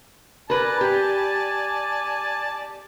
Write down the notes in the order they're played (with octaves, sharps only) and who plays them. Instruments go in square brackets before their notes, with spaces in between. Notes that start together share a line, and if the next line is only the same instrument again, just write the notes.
[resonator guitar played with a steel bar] A#4 B4 [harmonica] D5 G#5 A5
[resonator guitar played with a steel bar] G4